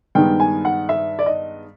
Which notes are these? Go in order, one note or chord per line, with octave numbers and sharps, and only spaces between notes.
G2 D#3 G#3 B3 G5
G#5
F#5
E5
D5
D#5